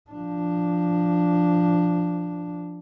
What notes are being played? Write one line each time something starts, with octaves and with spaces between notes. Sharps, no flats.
F3 D4